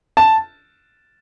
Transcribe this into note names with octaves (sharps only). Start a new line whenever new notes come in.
A5